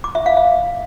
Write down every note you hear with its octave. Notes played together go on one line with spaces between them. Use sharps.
D6
E5
F5
E5